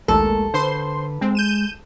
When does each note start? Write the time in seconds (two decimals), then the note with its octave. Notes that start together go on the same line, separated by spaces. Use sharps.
0.08 A#1 D#2 G#3 A3 A4 A#4
0.54 D3 D4 B4 C5 C6
1.21 G#3 C4
1.35 G6 D#7 E7